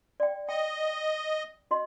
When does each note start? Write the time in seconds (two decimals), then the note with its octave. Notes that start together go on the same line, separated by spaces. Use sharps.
0.20 D5 G5
0.49 D#5 G5
1.71 F#4 D#5 C6